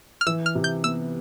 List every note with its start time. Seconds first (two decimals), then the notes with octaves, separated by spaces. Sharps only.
0.21 F6
0.26 E3 E6
0.46 F6
0.55 C3
0.64 G6
0.84 B3 E6